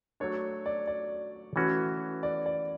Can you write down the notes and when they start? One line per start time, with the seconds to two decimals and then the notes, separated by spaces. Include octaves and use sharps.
0.20 F#3 A3 D4 C#5
0.66 D5
0.87 D5
1.56 E3 A3 C#4 F#4 B4
2.23 D5
2.46 D5